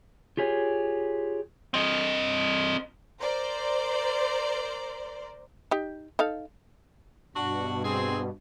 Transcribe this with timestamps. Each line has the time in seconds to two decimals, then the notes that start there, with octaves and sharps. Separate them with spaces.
0.37 F4 G4 G#4 C#5
1.74 C4 D#5
3.21 A#4 C5 D5
5.71 D#4 G4
6.19 D#4 A4 F5
7.36 G2 B2 D4 F#4
7.84 C4 G#4